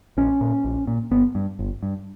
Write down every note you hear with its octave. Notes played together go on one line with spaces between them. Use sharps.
A#1 C#4
A#2
A#1
A#2
G1 B3
G2
G1
G2